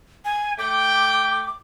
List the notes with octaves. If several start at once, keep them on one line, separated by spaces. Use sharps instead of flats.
G#5
A3 G5 D6